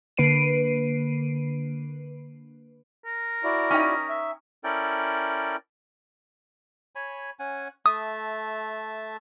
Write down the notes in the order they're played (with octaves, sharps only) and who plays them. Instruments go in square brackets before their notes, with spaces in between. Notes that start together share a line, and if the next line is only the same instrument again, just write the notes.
[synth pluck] D3 A#3 B4 C7 D7 D#7
[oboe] A#4
[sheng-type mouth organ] E4 F#4 D5
[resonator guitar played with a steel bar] C#4 D#4 G5
[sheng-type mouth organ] E5
[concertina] C#4 E4 A4 A#4 D5 G5
[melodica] C#5 G#5 B5
C#4 F#5 G#5
[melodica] A3 E5 A5 [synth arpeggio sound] D#6